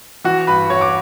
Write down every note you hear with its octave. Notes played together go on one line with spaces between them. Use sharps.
E3 F#4 F#5
G2 B4 B5
E3 C#5 C#6
D6